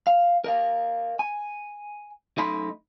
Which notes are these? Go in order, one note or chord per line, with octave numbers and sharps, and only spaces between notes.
F5
A#4 D#5 F5
G#5
F#2 A3 D#4 D#5 B5 C6